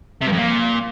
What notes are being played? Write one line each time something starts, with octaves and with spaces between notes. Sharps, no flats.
C3
G2
F2
A#2